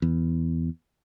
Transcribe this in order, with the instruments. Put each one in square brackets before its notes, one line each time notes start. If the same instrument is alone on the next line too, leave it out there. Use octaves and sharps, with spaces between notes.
[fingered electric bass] E2